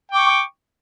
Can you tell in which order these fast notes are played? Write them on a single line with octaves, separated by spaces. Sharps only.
G5 D6 C#6